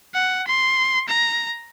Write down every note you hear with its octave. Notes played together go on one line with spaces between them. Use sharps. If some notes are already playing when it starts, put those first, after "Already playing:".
F#5
C6
A#5